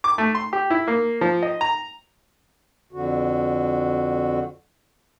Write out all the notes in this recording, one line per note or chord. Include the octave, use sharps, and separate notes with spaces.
D6
A3
C6
G4
E4
A#3
F3
D#5
A#5
F2 D3 F#4